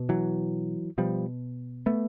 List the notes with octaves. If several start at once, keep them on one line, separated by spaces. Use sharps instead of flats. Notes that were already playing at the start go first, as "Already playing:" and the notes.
Already playing: B2
E3 F#3
B2 F3 G3
A3 B3